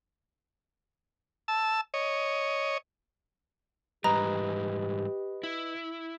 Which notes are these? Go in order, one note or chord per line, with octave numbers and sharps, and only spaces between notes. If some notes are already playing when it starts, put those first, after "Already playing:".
A5 E6
C#5 D#5
G#2 E3 G3 G4 B4 D#5 A#5
E4